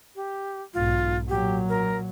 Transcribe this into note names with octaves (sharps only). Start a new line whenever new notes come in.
G4
B1 G#2 F4
A#2 F#3 G4
A#4